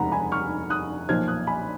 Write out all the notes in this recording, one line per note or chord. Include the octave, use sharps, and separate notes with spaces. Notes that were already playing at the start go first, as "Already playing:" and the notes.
Already playing: F1 D#2 C#3 G#3 D#4 F#5 A#5 B5
G#5 B5
C#6 F6
D#6 F#6
B1 A#2 F3 F6 G#6
D#6 F#6
G#5 B5